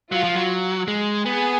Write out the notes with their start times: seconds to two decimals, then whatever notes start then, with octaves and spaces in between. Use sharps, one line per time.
0.11 F#3 F4
0.24 F3
0.36 F#3
0.88 G#3
1.25 B3 G#4